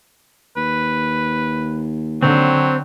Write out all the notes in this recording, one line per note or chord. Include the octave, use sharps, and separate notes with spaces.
D#2 B4
D3 F#3 C4